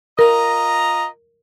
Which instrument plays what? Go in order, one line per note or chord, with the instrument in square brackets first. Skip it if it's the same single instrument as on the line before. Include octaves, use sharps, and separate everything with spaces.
[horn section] F4 D#5 A#5 [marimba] A#4